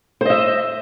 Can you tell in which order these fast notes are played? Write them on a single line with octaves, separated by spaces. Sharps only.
C5 D#5 E5